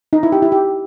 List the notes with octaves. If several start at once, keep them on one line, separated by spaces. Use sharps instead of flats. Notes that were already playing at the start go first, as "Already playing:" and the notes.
D#4
E4
G4
E4
G4